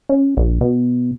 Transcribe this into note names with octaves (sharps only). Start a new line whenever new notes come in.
C#4
A#1
B2